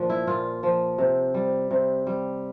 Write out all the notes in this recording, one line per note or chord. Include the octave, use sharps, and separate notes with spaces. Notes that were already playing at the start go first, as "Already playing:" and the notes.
Already playing: A#2 F3 D4
E4
A#2 F4
F3
C3
G3
C3
G3